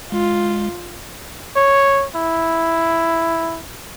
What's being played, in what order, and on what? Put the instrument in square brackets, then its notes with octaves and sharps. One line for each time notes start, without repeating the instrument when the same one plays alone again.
[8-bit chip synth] G#3 [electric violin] F4
[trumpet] C#5
E4